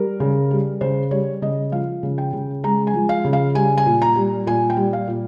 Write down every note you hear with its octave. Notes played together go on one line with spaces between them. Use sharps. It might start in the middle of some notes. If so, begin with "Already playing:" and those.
Already playing: G3 A#4
C#3
G3
C#3 C5
G3 C#5
C#3 D#5
F3 F5
C#3
G5
C#3
G#3 A#5
G#5
F3
F5
C#3
F5
G3 G#5
G#5
A#2
A#5
G3
A#2 G#5
G5
G3
F5
A#2